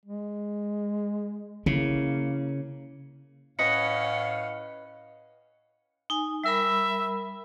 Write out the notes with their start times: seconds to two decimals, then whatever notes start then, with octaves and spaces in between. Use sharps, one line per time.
0.06 G#3
1.66 C#3 A#3 E4
3.59 A2 C#4 B4 D#5 F5 F#5 B5 C#7
6.10 D#4 G#5
6.44 G3 A#4 E5 B5